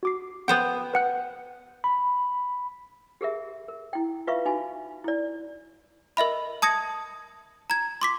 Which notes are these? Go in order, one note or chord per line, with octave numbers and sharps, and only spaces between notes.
F#4 D6 C7
B3 C5 F#5 G5
B4 F#5 F#6
B5
G4 G#4 A#4 E5
A#4
E4 G5
F4 B4 E5 F5 C#6
D#4 F#4 G#5
E4 D5
A#4 D#5 E5 B5
A5 D#6 G#6 A#6 C#7
A#5 G#6
C6 D6 B6